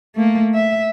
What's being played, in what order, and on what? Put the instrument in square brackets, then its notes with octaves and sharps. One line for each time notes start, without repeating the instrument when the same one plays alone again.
[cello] A3 A#3
E5